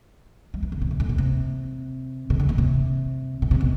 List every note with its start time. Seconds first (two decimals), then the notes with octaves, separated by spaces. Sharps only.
0.54 G3
0.63 E3
0.72 D3
0.82 C3
0.91 B2
1.00 A2
1.09 B2
1.18 C3
2.30 C3
2.40 D3
2.49 E3
2.58 C3
3.42 B2
3.51 C3
3.61 B2